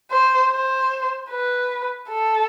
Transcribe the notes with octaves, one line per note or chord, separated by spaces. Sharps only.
C5
C5
B4
A4